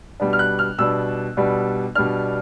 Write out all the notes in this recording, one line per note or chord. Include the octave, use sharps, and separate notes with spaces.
B2 G3 B3 D4
F6
F#6
F6
B2 G3 B3 D4 E6
B2 G3 B3 D4
B2 G3 B3 D4 F6